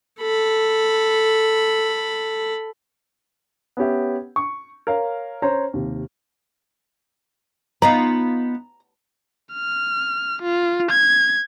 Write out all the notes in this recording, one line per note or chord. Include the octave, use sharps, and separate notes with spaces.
A4 B5
B3 C#4 G4 E5
C#6
A#4 C#5 F5
C#4 C5 C#5 A#5
D#2 C3
B3 D#4 F4 A#5
F6
F4
G#6